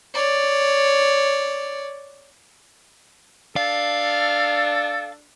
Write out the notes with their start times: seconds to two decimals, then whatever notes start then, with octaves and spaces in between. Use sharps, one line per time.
0.15 C#5 D5
3.56 D4 A4 F5